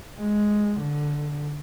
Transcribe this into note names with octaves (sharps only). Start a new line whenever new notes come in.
G#3
D3